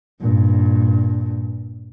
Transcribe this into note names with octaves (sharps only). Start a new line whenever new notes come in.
G2 A#2